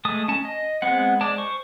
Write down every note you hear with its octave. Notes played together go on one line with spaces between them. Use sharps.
G#3 A3 A5 D#6
C#4 A5
D#5
G#3 B3 C4 F#5
G#3 D5 A5
C5 C#6